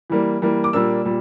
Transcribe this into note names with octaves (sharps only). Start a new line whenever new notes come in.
E3 G3 A#3
E3 G3 A#3
D6
A#2 G3 A#3 D4 E6
A#2 G3